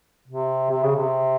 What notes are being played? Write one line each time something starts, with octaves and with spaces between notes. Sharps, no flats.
C3
C3
C#3
C3